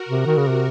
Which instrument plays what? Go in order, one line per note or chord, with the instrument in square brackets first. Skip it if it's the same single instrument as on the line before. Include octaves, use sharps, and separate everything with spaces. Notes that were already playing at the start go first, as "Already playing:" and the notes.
Already playing: [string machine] F#4 A#4
[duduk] C3
D#3
C#3
C3